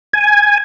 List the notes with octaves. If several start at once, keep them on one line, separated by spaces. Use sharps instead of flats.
G#5